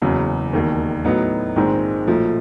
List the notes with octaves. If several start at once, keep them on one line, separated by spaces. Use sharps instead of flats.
F#1 E2 C#3 F#3
E1 D#2 D#3
A2 F#3 B3 D#4
A#1 G#2 D#3 G#3 C4
B1 A#2 F3 A3